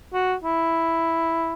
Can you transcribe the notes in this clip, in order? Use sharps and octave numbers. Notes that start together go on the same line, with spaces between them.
F#4
E4